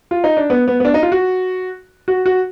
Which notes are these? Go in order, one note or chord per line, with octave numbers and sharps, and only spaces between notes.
F4
D#4
D4
B3
B3
B3
D4
D#4
F4
F#4
F#4
F#4